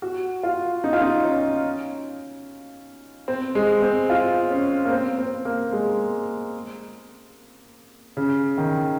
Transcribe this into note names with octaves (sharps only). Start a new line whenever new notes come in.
F#4
F4
D#4
F4
D#4
C#4
C4
G#3
C4
F4
C#4
A#3
C4
C4
A#3
G#3
C#3
D#3